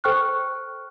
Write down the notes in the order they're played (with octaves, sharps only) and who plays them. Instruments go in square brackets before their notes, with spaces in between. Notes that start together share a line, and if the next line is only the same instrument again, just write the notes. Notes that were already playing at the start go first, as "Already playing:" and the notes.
[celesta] A4 C5 G5 C#6 F6 F#6